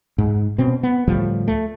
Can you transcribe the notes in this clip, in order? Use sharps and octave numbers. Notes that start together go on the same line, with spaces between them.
G#2
B2 C4 C#4
B3
D2 A2 F3 G3
A3